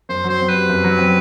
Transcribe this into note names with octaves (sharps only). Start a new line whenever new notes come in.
F#2 C5
F#3
C5
C4
G4 B4
F#2
F#3
C4